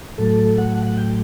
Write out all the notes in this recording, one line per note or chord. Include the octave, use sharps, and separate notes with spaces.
A2 F#3 A3 A4
F#5
F#5
G5